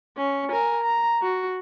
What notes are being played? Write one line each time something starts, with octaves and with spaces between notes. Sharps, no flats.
C#4
A#4 G#5
A#5
F#4